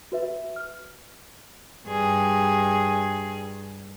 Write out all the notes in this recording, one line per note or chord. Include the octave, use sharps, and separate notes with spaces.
F#4 B4 E5
F6
G2 G#4